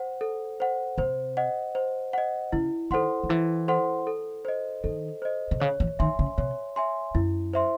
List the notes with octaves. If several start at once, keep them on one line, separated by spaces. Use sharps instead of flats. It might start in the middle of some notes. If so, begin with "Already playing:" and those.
Already playing: C5 F#5
A4
C5 F#5
C3 C5
D#5 F#5
C5
D#5 F#5
C#3 E4
D#3 A4 C5 F#5 C6
D#3
E3 E4
A4 C5 F#5 C6
A4
C5 D#5
D#3 A4
C5 D#5
C3
C#3 C#5
E3
D#3 E5 G#5 C6
C#3
C3 C#5
E5 G#5 C6
F#2 E4
C5 E5 C6